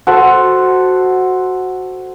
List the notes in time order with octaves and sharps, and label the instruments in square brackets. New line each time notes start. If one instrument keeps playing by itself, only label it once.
[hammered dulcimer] F#4 A4 C5